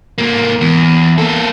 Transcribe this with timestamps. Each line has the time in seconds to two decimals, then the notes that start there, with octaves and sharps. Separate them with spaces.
0.18 G#2 A#3
0.61 E2
1.18 A#3 A4